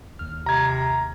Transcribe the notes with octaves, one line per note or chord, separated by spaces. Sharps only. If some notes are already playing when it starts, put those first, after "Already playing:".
D#2 F6
C3 A#5 G#6